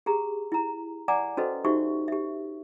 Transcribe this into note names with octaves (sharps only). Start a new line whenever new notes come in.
G4 G#4 A#5
E4 A#5
D5 F#5 G#5 A#5 D6
C#4 F#4 A4 B4 C5 D#5
D#4 F#4 G4 C5 E5 C#6
G4 E5